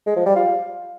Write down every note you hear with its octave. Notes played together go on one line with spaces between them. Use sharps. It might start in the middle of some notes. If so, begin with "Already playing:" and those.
G#3
F3
G3
F4